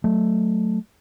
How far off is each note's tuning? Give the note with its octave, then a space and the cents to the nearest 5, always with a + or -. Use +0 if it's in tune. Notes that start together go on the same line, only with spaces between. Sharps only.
F#3 +0 A3 +0